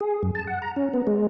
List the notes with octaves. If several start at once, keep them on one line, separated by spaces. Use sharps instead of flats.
G#4
F#2
A5
F#5
A#5
C#4
B3
G#3